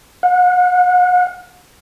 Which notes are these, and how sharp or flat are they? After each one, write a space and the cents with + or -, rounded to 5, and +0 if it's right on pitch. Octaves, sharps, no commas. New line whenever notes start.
F#5 -40